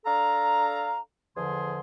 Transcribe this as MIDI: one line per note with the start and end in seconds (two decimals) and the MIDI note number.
0.06 0.99 62
0.06 0.99 69
0.06 0.99 77
0.06 0.99 82
1.36 1.80 40
1.36 1.80 50
1.36 1.80 53
1.36 1.80 68
1.36 1.80 84